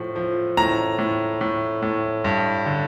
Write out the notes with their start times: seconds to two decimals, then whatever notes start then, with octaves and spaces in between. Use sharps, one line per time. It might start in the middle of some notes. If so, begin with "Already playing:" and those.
Already playing: A2 F3
0.15 F3
0.57 A2 A#5
0.98 A2
1.41 A2
1.82 A2
2.24 G2
2.66 D3